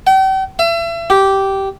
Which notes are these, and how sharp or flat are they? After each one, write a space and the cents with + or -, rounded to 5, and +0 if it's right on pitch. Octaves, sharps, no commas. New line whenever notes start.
G5 -40
E5 +35
G4 -10